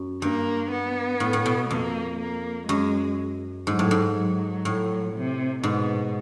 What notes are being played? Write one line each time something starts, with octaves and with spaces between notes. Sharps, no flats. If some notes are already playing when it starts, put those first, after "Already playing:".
Already playing: F#2
G2 A#3
B3
A2
A2
B2
F2 A#3
A#3
F#2 G#3
G#2 F#3
A2
G#2
F#3
A2
C3
G#2 B2